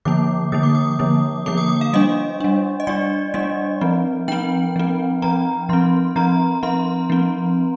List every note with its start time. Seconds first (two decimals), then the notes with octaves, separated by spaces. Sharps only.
0.05 D3 F3 A#3 D6
0.52 D3 F3 A#3 D#6
0.63 D6
0.75 D#6
0.99 D3 F3 A#3
1.46 D3 F3 A#3 D6
1.58 D#6
1.69 D#6
1.81 F5
1.93 G3 D4 D#5
2.40 G3 D4
2.80 D#5
2.87 G3 D4 D5
3.34 G3 D4 D#5
3.81 F3 C4
4.28 F3 C4 G5
4.76 F3 C4
5.22 F3 C4 A#5
5.69 F3 C4 C6
6.16 F3 C4 A#5
6.63 F3 C4 C6
7.10 F3 C4